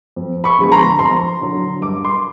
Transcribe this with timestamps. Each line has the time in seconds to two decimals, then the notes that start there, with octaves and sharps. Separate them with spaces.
0.16 F2
0.44 B5 C#6
0.58 D3 F3 G#3 B3
0.72 A#5 C6
0.99 F2 A#5 C6
1.41 D3 F#3
1.81 G2 D6
2.05 C6 D6